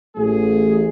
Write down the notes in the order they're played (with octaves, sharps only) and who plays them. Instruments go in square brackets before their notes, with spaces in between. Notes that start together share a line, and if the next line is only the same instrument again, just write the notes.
[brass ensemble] A1 G#4 [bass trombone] A3